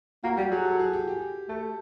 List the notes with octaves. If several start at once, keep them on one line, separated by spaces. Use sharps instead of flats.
A#3 F#4
G3 G4
F#3 G#4
A4
G#4
G4
G4
A3 A4